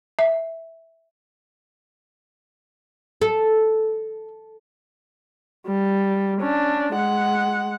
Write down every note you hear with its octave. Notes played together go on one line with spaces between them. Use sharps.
E5
A4
G3
C#4 D4
G#3 F#5